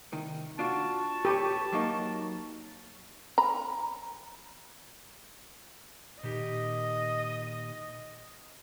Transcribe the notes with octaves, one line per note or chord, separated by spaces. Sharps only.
C2 D#3
D4 F4 F#4 A5 C#6
G4 A4 B4 C#5
F#3 A#3 D#4
A#5 B5
A#2 D#3 G4 D#5